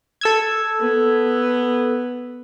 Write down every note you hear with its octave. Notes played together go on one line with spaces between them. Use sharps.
A4 E6 G#6
B3